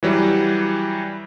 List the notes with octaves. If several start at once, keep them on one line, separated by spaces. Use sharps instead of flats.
E3 F#3 G3